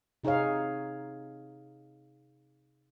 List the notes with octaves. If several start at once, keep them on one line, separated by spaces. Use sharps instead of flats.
C3 D#4 G#4 C#5 F5